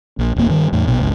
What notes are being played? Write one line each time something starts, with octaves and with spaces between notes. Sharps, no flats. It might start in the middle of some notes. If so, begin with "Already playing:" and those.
A#1
D1 E2 A#3
G2 D#3
E2 A2
A#1 B2
G1 C#2